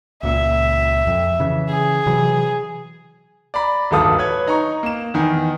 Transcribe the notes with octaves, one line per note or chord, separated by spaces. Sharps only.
C#2 A#2 E5
F2
C#3 E3
G#4
C3 E3 F#3
D5 A#5 B5
D1 G1 D#2 A4 F5 D#6
B4 C#5 G#6
D#4 A#5 C#6
A#3 E7
E2 D#3 G#5